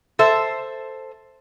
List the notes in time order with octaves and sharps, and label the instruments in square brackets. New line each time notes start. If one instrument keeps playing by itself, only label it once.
[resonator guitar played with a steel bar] A4 C5 E5